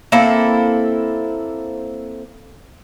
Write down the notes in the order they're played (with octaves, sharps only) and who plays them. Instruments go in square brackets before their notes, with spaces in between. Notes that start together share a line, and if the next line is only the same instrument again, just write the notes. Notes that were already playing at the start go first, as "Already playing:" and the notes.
[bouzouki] A#3 C4 E4 A4